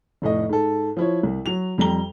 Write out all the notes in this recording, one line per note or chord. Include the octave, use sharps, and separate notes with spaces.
F1 A2 A3 D#5
G#2 A4
F3 E4 C#5
C2
F#3 F7
F2 G3 A#5 G7